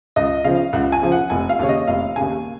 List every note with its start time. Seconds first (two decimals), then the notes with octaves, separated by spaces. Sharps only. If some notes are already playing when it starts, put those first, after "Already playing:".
0.16 C#2 D#5
0.44 C#3 F3 F5
0.73 C#2 F#5
0.92 G#5
1.02 C#3 F3
1.12 F#5
1.30 F1 G#5
1.49 F5
1.59 D#2 C#3 C#5
1.69 D#5
1.87 F1 F5
2.16 D#2 C#3 G#5